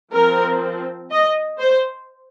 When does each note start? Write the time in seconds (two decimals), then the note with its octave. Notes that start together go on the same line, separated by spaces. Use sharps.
0.13 F3 C4 A#4
1.11 D#5
1.59 C5